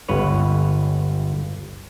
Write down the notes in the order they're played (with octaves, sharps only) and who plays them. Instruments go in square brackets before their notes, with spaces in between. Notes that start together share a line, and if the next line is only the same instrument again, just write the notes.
[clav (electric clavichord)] G1 C#2 B4 C#5